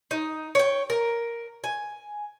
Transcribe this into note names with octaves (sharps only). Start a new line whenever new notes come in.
D#4
C#5 G5
A#4
G#5